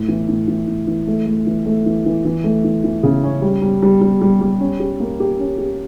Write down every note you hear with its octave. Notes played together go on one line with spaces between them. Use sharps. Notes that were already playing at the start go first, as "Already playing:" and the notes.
Already playing: A2
E3
A2
E3
A2
E3
A3
A3
E3
A3
E3
E3
E3
A3
E3
E3
C#3
C#4
G3
G3
G3
G3
G3
G3
C#4
G4
A#3
G4
C#4
G4